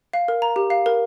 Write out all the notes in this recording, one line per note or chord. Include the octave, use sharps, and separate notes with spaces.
F5
A#4
A#5
G4
F5
A#4